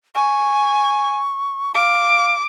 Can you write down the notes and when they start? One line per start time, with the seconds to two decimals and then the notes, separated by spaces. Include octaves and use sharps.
0.15 G#5 C#6
1.75 F5 D6